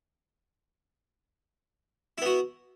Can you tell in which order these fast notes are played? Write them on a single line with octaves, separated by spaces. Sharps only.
E4 B3 F#4